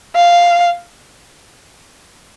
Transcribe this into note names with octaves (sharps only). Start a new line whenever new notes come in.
F5